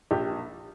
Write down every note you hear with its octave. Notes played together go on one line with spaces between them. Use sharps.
A#1 G4